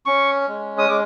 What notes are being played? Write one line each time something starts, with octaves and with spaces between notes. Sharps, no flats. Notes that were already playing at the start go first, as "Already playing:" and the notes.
C#4 C#6
G#3
D#6
G#3 D6